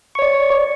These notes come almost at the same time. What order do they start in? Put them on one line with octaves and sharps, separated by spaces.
C#6 C#5 D5